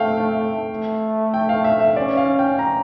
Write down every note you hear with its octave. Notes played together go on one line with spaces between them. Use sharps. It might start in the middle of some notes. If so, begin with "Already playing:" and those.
Already playing: A3 F5 G5
A3
G5
F5
E5
E5
C#4 D5
F5
G5
A#5